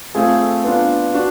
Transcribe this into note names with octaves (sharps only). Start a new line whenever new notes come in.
A3 C4 F4 G#4
B3 D4 F4
D4 F#4